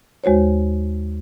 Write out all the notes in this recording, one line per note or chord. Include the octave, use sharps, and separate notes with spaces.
D#2 G#3 F#4 C5 C#5